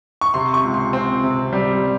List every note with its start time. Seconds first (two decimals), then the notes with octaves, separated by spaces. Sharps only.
0.21 C#6
0.34 C3 C6
0.54 C#6
0.64 C#2
0.74 C6
0.93 C4
1.23 C3
1.53 G3